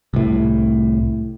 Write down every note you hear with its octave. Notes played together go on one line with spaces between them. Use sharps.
C2 A2